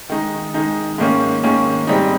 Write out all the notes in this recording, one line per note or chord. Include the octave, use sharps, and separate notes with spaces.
D#3 G#3 D#4
D#3 G#3 D#4
G#2 D#3 A#3 C#4
G#2 D#3 A#3 C#4
G#2 G3 C4 D#4